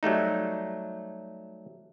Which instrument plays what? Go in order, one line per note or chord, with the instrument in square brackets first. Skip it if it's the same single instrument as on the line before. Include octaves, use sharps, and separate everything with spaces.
[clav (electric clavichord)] F#3 G3 A3 D#4